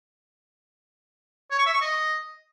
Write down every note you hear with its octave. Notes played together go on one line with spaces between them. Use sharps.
C#5
C#6
E5
C#6
D#5